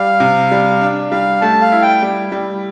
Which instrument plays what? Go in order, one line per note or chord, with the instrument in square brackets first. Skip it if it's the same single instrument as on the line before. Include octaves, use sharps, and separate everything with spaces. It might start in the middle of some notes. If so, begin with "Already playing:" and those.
Already playing: [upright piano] G3 [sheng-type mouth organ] F5
[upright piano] C3
G3
D4
[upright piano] G3 [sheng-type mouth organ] F5
[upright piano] A3 [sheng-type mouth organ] A5
[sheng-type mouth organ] F5
[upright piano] E4
[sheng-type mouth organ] G5
[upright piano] G3
G3